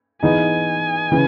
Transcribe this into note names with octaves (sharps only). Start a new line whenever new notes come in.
E3 B3 D#4 G#4 G#5
C#3 E3